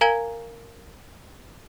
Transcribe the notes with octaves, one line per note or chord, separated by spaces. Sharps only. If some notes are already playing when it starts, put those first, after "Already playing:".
A#4 F5 G#5 A#5 G#6 G7